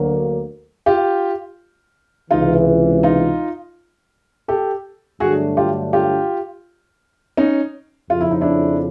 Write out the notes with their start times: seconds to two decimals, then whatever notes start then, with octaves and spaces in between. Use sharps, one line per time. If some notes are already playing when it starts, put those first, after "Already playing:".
Already playing: D2 D3 F#3 A#3
0.86 F4 G4
2.31 C#2 C3 E3 D#4 F4
3.03 D#4 F4
4.48 G4 A4
5.20 G2 D3 F#3 A3 D4 F#4 G#4
5.57 F4 G4
5.93 F4 G4
7.37 C#4 D#4
8.10 F2 C#3 F3 F4
8.21 E4
8.31 D#4
8.41 D4 E4